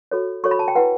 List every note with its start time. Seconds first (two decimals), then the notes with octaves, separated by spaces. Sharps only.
0.11 F#4 A4 C#5
0.44 F#4 A4 C#5 C#6
0.51 B5
0.59 A5
0.68 G5
0.75 E4 B4 F#5